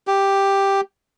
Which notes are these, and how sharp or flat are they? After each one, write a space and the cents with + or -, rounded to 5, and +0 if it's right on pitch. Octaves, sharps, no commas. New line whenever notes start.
G4 +5